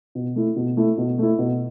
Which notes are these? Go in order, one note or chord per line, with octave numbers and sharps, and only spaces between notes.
B2
A3 E4
B2
A3 E4
B2
A3 E4
B2